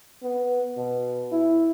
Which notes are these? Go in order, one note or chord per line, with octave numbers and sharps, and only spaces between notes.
B3
B2
E4